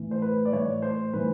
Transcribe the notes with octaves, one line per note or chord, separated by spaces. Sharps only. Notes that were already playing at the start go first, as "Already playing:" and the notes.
Already playing: A2 E3
C5
B4
D5
A2 E3 C#5
C5
A2 E3 B4